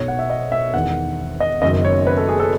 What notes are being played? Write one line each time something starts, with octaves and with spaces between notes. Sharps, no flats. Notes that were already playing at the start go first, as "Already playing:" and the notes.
Already playing: B1 B2 C#5
F#5
E5
D#5
E5
E1 E2 D#3 F#5
D#5
F#1 F#2 D#3 D#5
C#5
B4
A4
G#4
A4